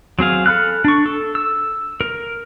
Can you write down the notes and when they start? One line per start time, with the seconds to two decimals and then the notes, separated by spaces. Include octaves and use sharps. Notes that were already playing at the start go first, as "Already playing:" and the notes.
0.19 F#3 C4 G#4 F5
0.46 A4 B5 F6 F#6
0.85 D4 C#6
1.06 A4
1.35 E6
2.01 A#4